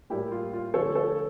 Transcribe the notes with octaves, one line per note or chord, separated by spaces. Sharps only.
A2 G3 A#3 E4 G4
F4
F4
D3 F3 A3 A4 C#5
A4 C#5